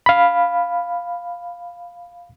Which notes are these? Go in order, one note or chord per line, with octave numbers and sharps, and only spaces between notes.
F5 B5